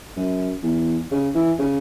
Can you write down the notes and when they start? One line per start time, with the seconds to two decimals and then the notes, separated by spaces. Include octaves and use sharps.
0.17 F#2
0.63 E2
1.11 C#3
1.35 E3
1.59 C#3